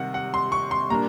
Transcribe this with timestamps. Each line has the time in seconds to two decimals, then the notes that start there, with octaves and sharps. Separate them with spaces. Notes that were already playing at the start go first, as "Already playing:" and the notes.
Already playing: C3 D#3 G3 C4 F#5
0.14 F#5
0.34 C6
0.52 C#6
0.71 C6
0.90 A#2 G3 A#3 D4 A#5